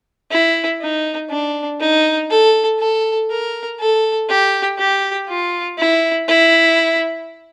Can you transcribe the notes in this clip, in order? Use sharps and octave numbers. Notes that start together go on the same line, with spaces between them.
E4
D#4
D4
D#4
A4
A4
A#4
A4
G4
G4
F4
E4
E4